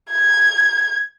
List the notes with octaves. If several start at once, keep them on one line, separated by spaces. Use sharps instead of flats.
G#6